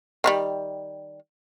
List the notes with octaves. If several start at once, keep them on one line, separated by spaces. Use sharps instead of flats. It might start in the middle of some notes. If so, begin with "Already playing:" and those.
D#3 F#3 G3